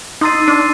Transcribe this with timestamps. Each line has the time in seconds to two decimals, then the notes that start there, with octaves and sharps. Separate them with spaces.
0.21 D#4 C6 E6 A6 C7 D#7
0.48 D4